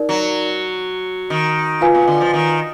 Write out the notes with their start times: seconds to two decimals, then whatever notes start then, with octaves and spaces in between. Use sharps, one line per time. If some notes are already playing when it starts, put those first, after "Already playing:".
Already playing: D#4 A#4 D5
0.09 F#3
1.30 D#3
1.81 F4 B4 F5 G#5
1.95 B2
2.07 D3
2.21 F3
2.33 D#3